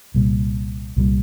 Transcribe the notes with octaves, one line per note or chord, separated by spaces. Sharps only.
C2 A#2 G3
C2 A#2 G3